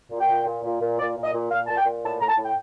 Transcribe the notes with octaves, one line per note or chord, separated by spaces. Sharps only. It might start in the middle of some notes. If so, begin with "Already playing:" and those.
A#2
G5
A#2
A#2
A#2
A#2
A#2 D5
A#2
D#5
A#2
A#2 F5
A#2 A5
G5
A#2
A2 A5
A2 A#5
A5
A2
G5